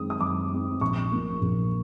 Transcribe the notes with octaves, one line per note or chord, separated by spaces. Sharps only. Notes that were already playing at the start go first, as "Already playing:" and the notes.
Already playing: F#2 D#3 G#3 C4 D#6
D#6
F#2 D6
D#3 G#3 C4
A#1 C#6
A#2 F3 A#3
A#1